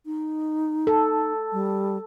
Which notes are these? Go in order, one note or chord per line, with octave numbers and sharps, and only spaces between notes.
D#4
A4
G3